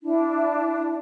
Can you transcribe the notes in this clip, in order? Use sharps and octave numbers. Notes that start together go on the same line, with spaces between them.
D4 E4